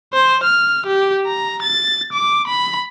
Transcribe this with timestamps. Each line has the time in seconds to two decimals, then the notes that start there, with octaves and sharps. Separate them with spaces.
0.13 C5
0.44 F6
0.87 G4
1.27 A#5
1.63 A6
2.13 D6
2.48 B5